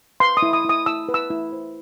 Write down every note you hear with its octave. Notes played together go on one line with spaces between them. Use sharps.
B4 C6
D#6
E4
D#6
E4 D#6
E4 E6
B4
E6
E4
C5